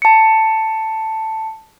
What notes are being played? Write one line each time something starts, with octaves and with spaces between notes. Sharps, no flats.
A5 C#7